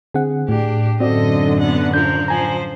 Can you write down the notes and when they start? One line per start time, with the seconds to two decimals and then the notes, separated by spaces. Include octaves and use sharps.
0.14 D3 C4 G#4 F#5
0.49 A2 D4 G4
1.00 F#2 D3 C4 F#4 A4 D5 D#5
1.60 B3 F#5
1.94 F3 A#4 G6
2.28 F3 C5 G#5 A#5